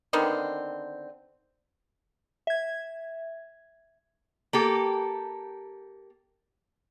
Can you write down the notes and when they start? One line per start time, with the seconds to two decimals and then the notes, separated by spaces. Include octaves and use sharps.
0.13 D3 D#3 B3 C4
2.47 E5 G#6
4.53 A#3 G4 A4